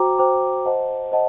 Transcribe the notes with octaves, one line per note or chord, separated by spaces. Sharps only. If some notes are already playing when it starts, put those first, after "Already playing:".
Already playing: F#4 C5 G5 A#5 D6
F#4 C5 G5 A#5 D6
C5 D#5 F#5 A5
C5 D#5 F#5 A5